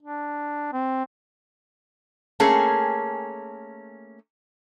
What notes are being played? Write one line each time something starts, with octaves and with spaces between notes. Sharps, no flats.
D4
C4
A3 A#3 C#4 G#4